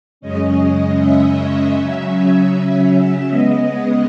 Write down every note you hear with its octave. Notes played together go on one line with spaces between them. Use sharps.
F#2 C#3 G#3 C#4 D#5
E5
C#3 F#3 C#4 E5
E5
C#3 G#3 B3 D#5